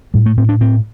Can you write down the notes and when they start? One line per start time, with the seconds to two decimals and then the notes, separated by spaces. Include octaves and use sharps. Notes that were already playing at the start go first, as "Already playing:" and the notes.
0.14 A2 G3
0.26 A3
0.37 A2 C4
0.49 D4
0.60 A2 C4